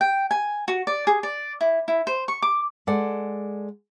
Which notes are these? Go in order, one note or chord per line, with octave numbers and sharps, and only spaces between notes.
G5
G#5
F#4
D5
G#4
D5
E4
E4
C5
C#6
D6
G#3 A4 D5 F#5